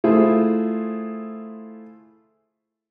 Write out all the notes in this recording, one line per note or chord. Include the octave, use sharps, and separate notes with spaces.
A3 E4 F4 G#4 C5